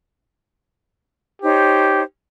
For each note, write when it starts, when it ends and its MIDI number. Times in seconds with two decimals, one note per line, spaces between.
1.42 2.03 63
1.42 2.02 67
1.42 2.03 72
1.42 2.03 73